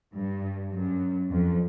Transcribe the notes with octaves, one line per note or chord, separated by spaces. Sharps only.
G2
F#2
F2